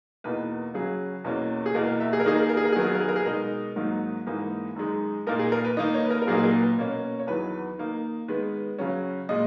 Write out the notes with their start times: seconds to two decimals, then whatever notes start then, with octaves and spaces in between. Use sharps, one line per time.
0.24 E2 B2 A#3 D#4 B4
0.74 C#3 F#3 C#4 G#4
1.24 E2 B2 A#3 C#4
1.66 G#4
1.75 E2 B2 A#3 A#4
1.87 A#4
2.00 E5
2.13 G#4
2.20 A#4
2.25 D#3 A#3 D#4 G#4
2.35 A#4
2.42 G#4
2.49 A#4
2.57 G#4
2.64 A#4
2.72 G#4
2.75 D#3 F#3 B3 D#4 A#4
2.87 G#4
2.95 A#4
3.01 G#4
3.09 A#4
3.16 G#4
3.26 B2 G#3 D#4 A#4
3.76 G#2 D#3 F#3 A#3 D#4
4.26 G#2 E3 A#3 D#4
4.76 F#2 D#3 G#3 D#4
5.27 A#2 A#3 D#4 A#4
5.39 G#4
5.52 A#4
5.65 B4
5.77 D#3 A#3 D#4 D#5
5.94 C#5
6.05 B4
6.11 A#4
6.22 A#4
6.27 A#2 F#3 A#3 D#4 G#4
6.38 G#4
6.44 A#4
6.60 B4
6.78 B2 A#3 C#4
7.20 C#5
7.27 E2 D#3 F#3 B3 B4
7.78 D#3 A#3 D#4
8.28 D#3 G#3 B3 B4
8.78 C#3 F#3 C#4
9.29 A#2 G#3 D#5